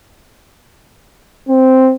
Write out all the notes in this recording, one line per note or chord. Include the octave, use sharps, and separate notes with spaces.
C4